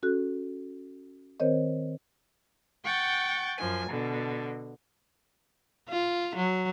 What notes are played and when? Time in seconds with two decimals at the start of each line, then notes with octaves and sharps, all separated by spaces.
0.03 C#4 F#4 A4 F#6
1.40 D#3 C4 A#4 C5 C#5 D#5
2.84 F#5 G5 C#6 G6 A6
3.58 F#2 F3 G#5
3.89 B2 D3
5.89 F4
6.36 F#3